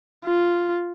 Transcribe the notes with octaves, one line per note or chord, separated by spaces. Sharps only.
F4